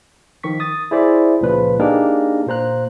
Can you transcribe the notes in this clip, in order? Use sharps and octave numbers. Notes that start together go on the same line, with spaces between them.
D#3 F3 C#6 B6
D#6 A6
E4 G#4 C5 D5 E5
C#2 A#2 C#3 F3 B4
A#3 D4 D#4 G4 G#4 A#4
A#2 A#3 C5 A#5 F#6